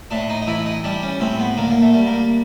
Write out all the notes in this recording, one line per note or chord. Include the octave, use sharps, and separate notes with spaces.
A2 D4
D#4
D#4
E3 E4
D#4
G3 D4
C#4
A2 C4
B3
D3 A#3
A#3
A3
G3
A#3